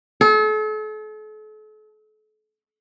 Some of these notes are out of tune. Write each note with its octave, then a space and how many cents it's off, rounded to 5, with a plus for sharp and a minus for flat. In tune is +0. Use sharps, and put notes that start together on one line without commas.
A4 -40